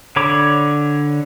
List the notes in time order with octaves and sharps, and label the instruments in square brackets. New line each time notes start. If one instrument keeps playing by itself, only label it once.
[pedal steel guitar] D3 C#5 B5 D6